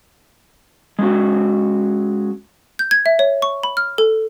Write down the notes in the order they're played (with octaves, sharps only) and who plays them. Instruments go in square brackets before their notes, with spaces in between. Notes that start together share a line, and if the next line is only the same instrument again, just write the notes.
[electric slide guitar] G#3 C#4 F#4
[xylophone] G6
G#6
E5
C#5
C#6
B5
F6
A4